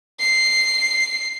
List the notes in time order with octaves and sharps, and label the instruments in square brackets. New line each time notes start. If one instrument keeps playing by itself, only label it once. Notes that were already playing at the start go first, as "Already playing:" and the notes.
[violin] C7